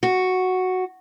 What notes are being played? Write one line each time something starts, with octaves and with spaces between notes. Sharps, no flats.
F#4